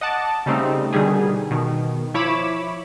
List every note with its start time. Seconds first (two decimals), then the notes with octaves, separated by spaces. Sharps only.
0.01 D#5 F#5 A5 D6
0.46 C#3 G3 A3 C4 D#4
0.93 B2 D3 D#3 G3 G#4
1.51 B2 D#3
2.14 F3 E4 C#5 B5 D6 E7